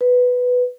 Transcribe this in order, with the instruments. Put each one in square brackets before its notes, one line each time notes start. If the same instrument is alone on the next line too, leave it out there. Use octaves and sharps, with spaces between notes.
[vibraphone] B4